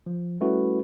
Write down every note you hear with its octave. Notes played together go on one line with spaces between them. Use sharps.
F3
G3 A3 C#4 E4 F#4 B4